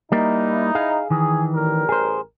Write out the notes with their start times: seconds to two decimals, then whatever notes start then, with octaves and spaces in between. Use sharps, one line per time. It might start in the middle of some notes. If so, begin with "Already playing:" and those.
0.12 G3 A#3 D#4 E4
0.75 G#4 F5
1.10 D#3 E3 G#4
1.54 A1 G3 A#4
1.89 G#4 C5